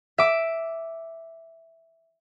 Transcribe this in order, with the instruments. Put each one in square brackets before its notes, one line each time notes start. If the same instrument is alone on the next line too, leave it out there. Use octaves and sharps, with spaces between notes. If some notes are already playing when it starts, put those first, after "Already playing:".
[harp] E5 D6